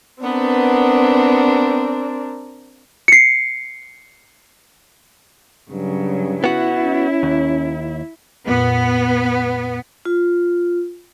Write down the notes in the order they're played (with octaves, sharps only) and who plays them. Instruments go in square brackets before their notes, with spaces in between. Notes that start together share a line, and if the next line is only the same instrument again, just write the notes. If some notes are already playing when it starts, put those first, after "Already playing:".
[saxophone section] B3 [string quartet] C4 D4 A#4
[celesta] C7 C#7
[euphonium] G2 [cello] C#3 F#3
[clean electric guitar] B3 F#4 [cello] E4
[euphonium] C#4
[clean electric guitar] D#2
[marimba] F2 A#2 [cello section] B3
[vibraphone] F4